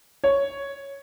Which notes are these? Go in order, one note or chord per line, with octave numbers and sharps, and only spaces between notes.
C#5